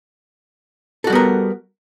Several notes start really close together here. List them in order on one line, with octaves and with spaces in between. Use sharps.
A4 F#4 G3 B3 A#4